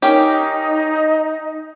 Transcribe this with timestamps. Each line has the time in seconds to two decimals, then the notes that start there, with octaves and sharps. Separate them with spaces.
0.02 A#3 C#4 D#4 G4
0.68 D#5